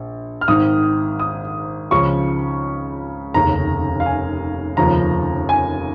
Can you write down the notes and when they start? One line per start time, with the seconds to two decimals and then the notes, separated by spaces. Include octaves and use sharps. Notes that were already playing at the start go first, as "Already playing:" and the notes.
Already playing: A#1
0.41 F6
0.48 G#1 G#2 D#3 D#6
1.20 D#6
1.91 C#2 C#3 F3 C#6
3.34 F1 D#2 C#3 A#5
4.00 F5
4.06 G#5
4.77 F1 D#2 C#3 F3 A#5
5.49 G#5